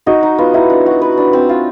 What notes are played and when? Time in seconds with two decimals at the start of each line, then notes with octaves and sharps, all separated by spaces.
0.06 D#4 F#4 D#5
0.23 D#4
0.38 B3 F4 F5
0.54 D#4 E4 E5
0.70 D4
0.86 F#4
1.02 B4
1.17 D4
1.33 C4
1.49 F4